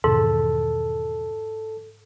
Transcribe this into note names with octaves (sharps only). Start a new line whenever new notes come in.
E2 G#2 B2 D#3 A4